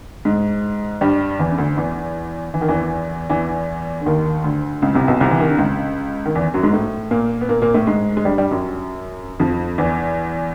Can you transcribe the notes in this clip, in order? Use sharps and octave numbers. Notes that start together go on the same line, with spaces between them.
G#2 G#3
G2 G3
E2 E3
C#3
D2 D3
E2 E3
E3
D#3
E2 E3
E2 E3
D3
D#2 D#3
D2 D3
C#2 C#3
C2 C3
B1 B2
C2 C3
E3
D#3
D3
C#2 C#3
D#3
E2 E3
F#2 F#3
G#2 G#3
A2 A3
A#2 A#3
B3
A#2 A#3
A#2 A#3
A2 A3
G#2 G#3
G#3
G2 G3
G2 G3
F#2 F#3
F2 F3
E2 E3